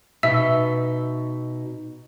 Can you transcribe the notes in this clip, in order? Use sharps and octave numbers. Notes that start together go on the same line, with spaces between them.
B2 D#4 E5 E6